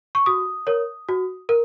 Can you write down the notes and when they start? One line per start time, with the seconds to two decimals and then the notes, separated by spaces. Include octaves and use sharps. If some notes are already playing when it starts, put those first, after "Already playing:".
0.15 C#6
0.26 F#4 D#6
0.67 A#4 C#5
1.09 F#4
1.49 A#4